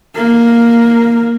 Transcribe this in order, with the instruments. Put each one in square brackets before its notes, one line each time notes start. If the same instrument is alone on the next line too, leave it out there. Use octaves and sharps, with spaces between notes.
[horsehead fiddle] A#3 A#4